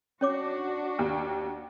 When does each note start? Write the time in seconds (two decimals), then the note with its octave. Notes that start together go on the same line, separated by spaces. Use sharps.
0.21 C#4 D4 F#4 C#5 D6
0.99 D#2